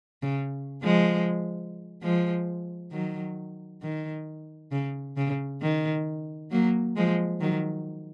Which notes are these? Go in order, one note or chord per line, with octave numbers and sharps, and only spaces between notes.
C#3
F3 G#3
F3 G#3
D#3 F#3
D#3
C#3
C#3
D#3
F#3 A#3
F3 G#3
D#3 F#3